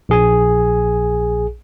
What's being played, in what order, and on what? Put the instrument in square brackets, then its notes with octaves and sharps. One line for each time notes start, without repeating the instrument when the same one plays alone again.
[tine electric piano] A#1 G#4 G#5